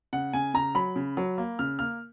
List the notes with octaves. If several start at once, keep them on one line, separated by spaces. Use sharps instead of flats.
C#3 F#5
C#3 G#5
C#3 A#5
F#3 B5
C#3
F#3
A#3
C#3 F6
A#3 F6